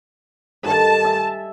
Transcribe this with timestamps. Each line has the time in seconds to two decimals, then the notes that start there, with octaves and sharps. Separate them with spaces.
0.65 G2 D#3 A4 A5
1.05 E5 G#5